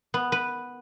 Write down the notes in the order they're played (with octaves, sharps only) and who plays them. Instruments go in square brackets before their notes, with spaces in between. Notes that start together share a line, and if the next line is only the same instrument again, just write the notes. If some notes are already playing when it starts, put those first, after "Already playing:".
[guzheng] B3
B4